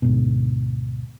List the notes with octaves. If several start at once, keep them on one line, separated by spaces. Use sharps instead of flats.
D2 G#2 B2